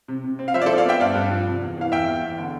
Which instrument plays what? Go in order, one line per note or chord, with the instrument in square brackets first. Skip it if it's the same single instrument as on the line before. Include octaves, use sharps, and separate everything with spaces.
[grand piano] C3
C3
C4
F5
F3 C5 E5
D5
A4 C5
F3
D5 F5
B3 E5 G5
G2 D5 F5
G2
F3
C3
E2
E3 F5
E2 E5 G5
E2
E2
D3